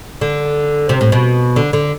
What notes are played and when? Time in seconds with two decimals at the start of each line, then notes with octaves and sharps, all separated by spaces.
0.21 D3
0.89 C3
1.01 A2
1.12 B2
1.56 D3
1.73 D3